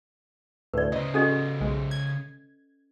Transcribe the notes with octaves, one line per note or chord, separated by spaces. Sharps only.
D2 A2 B4 D5
C#3 C5 D#5
C#4 F#4 G#4 A4 D#5
B1 G#3
G#6